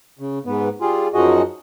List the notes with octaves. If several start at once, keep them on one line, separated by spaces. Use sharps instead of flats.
C#3
G#2 B3
G3 F4 G#4
F#2 F3 D#4 F#4 G#4 D#5